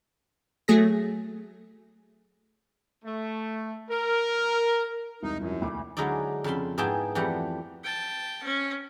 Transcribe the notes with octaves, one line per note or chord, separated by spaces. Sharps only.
F#3 A3 G#4 A#6
A3
A#4
E1 C2 D#4
F#2 F3 C#4 E4
D2 D6
D3 F#3 G#3 D#4 E4 D5
F2 C#3 A5 B5 C6
G#2 B3 E4 G#4 G5 A5
F2 E3 G3 A3 G4 F#5
G5 A5
C#4